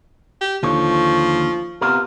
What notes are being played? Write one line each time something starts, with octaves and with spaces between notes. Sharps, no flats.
G4
D#2 D3 F3 C#5
C3 B3 F4 A#4